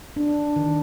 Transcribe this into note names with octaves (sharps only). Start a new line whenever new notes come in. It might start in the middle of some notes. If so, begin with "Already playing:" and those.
D4
D#3